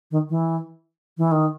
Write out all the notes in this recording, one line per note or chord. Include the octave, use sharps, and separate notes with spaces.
D#3
E3
E3
D#3